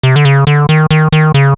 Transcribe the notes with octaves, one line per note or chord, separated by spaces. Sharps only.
C3
D3
C#3
D3
D#3
D#3
D#3
C#3